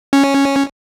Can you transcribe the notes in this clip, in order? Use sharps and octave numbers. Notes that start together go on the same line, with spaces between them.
C#4